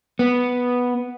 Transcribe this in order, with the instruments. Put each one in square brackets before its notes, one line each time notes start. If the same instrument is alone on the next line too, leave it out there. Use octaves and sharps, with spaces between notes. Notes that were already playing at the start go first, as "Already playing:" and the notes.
[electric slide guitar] B3